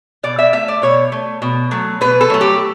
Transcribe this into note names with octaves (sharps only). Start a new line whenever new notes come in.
B2 D5
E5
A3 E5
D5
B2 C#5
A3
B2
F#3 A3
B2 B4
A4
F#3 A3
G4